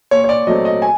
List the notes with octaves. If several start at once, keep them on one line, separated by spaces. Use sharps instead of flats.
A#2 C#5
C#5
D5
F#3 A3 C4 D#5
D#5
G#5